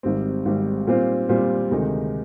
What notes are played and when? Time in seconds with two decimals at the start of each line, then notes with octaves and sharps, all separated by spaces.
0.03 G#1 G#2 G3 C4
0.45 G#1 G#2 G3 C4
0.87 A#2 G3 C4 F4 C5
1.29 A#2 G3 C4 F4 C5
1.71 D2 C3 D#3 G#3 D#4